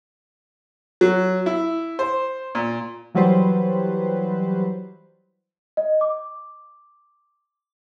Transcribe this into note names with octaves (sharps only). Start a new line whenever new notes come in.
F#3
E4
C5
A#2
E3 F#3 G3 B4 C5
D#5
D6